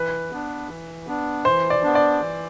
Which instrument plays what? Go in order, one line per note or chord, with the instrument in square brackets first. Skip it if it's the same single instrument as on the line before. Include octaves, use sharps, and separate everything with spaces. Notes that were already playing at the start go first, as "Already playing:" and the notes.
Already playing: [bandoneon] E3 [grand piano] B4
[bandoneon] B3 D4
E3
B3 D4
[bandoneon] E3 [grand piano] C5
[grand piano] D5
[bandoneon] B3 D4
[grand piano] D5
[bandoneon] E3